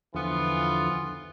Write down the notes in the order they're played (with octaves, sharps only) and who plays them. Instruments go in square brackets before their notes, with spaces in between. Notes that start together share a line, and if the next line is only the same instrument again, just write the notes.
[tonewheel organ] E2 D3 F3 [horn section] E3 B3 F4